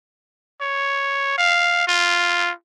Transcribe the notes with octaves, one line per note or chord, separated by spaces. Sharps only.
C#5
F5
F4